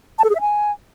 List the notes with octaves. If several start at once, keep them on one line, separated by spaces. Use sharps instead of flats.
A5
A4
G#4
E5
G#5